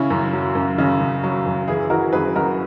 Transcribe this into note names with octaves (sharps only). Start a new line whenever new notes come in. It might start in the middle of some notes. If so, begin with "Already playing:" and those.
Already playing: C#3 C#4 E4
F#2
F#3
F#2
C#3
F#2
F#3
F#2
E3 E4 G#4
E3 F#4 A#4
F#2 G#4 B4
F#2 F#4 A#4